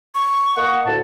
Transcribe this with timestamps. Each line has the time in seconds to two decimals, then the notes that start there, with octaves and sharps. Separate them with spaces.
0.15 C#6
0.56 A#3 D#5 F#5
0.86 D2 A2 A5